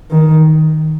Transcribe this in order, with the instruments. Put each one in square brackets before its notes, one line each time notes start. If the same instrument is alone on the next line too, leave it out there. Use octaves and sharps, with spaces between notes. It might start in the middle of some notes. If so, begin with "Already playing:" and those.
[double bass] D#3